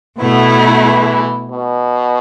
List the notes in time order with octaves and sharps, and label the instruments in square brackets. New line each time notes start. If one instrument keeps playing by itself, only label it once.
[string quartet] B2 A3 E4 [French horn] B3
[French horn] E3
B2